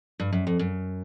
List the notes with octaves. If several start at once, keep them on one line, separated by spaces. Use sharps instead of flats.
G2
F#2
F2
F#2